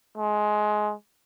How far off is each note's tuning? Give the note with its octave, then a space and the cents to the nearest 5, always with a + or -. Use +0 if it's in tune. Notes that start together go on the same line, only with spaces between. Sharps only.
G#3 +20